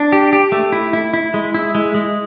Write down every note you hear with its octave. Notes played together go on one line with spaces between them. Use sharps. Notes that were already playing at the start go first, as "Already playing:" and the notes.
Already playing: D4
G4
G4
A3
E4
E4
E4
G#3
E4
G#3
G#3